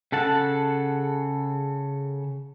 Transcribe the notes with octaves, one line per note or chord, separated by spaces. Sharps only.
C#3 A4 F#5 A5